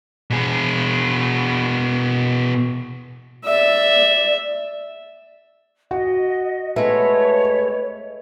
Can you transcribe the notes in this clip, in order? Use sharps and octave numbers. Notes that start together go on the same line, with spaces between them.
B2 G#4
D5 E5
F#4 D#5
G#3 A3 B4 C#5